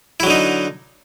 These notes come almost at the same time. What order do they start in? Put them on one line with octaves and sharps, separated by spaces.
E4 F#3 D3 D#4